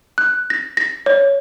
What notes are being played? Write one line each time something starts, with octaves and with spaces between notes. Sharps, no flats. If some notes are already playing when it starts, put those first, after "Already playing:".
F#6
A#6
A#6
C#5